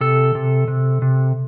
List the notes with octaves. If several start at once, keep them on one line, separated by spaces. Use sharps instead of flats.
C3 A4
C3
C3
C3